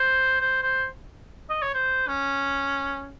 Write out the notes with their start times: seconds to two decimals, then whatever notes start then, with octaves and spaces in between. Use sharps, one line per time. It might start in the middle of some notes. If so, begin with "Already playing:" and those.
Already playing: C5
0.40 C5
0.62 C5
1.50 D#5
1.62 C#5
1.74 C5
2.08 C#4